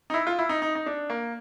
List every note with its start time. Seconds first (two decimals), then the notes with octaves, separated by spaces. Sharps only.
0.10 D#4
0.14 E4
0.27 F4
0.39 E4
0.49 D#4
0.62 D#4
0.75 D#4
0.86 D4
1.10 A#3